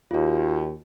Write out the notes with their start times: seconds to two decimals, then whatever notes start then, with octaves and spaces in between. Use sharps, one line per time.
0.11 D#2 F4 F#4